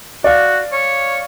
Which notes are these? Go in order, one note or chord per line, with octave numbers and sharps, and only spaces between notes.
F#4 D5 F5
C#5